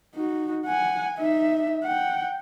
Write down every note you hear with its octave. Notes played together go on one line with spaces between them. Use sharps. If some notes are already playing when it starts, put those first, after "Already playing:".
D#4 F#4
F#5 G#5
D#4 E5
F#5 G5